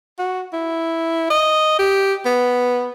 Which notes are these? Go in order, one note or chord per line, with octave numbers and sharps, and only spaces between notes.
F#4
E4
D#5
G4
B3